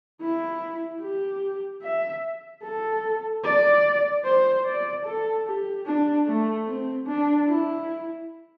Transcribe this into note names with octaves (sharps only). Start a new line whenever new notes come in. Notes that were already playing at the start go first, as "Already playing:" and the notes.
E4
G4
E5
A4
D5
C5
D5
A4
G4
D4
A3
C4
D4
E4